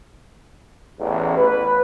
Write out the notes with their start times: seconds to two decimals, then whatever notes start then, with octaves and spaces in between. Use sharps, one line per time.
0.99 A1 E2
1.36 B4